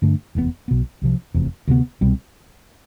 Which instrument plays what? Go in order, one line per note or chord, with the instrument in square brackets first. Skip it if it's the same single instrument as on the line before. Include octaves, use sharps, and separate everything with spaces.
[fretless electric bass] G2 D3 A3 D4
F1 E2 B2 B3
B1 B2 B3
C2 C3 F3
F1 E2 C3
D2 C3 G3 B3
C2 B2 G3 C4